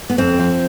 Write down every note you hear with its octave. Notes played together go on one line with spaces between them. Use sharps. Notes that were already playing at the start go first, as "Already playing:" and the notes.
B3
F2 C4
F3